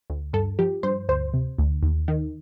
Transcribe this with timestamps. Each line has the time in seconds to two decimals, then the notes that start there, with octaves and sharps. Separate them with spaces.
0.10 D2
0.33 G2 A4
0.59 F3 G4
0.83 G2 C5
1.08 D2 C5
1.34 C3
1.58 D2
1.83 D#2
2.08 D#3